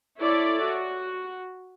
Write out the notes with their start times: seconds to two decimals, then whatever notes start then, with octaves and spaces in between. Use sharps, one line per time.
0.19 E4 A4 C#5 D5 E5
0.63 F#4